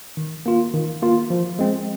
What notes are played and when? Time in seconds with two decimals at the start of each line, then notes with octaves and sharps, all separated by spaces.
0.17 D#3
0.46 A#3 F4
0.74 D#3
1.02 A#3 F4
1.30 F3
1.59 G#3 C4